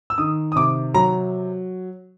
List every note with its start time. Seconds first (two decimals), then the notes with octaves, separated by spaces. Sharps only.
0.10 E6
0.18 D#3 D#6
0.52 D#6
0.56 C3 D6
0.94 F#3 A#5